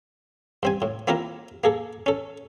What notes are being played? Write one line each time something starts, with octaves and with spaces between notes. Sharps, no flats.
G2 C4 G#5
A2
A#3 C4 E4 F4 A#4
A#3 G#4 A4
C#4 A4